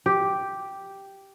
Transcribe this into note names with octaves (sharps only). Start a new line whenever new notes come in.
G4